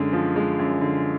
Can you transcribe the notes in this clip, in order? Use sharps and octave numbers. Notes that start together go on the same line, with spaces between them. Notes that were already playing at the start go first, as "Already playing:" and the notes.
Already playing: F#2 D3 G#3
F3
G#3
F#2
D3